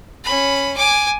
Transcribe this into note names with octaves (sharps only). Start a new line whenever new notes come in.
C#4 B5
G#5 D6